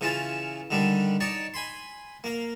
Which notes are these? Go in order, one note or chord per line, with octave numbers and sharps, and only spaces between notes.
C#3 E3 C#4 F4 A5
D3 D#3 G3 D4
D#4 C#5 D5 A5
G#5 B5 C6
A#3 F5